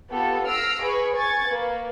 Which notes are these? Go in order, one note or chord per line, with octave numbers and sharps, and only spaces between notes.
B3 F4 G4 A4
E6 F6 A#6 C7 D7
G#4 B4 B5 C#6
G#5 C#6 G#6 A6
A#3 B4